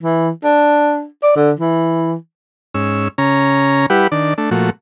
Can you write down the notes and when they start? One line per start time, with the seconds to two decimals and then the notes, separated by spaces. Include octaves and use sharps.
0.03 E3
0.44 D4
1.23 D5
1.36 D3
1.60 E3
2.74 G#2 C#4 E6
3.18 C#3 C#4 A#5
3.90 G3 E4 G4 B4 F#5
4.12 D#3 D4 D5
4.38 A3 D4
4.51 A#2 F3 A3 F#4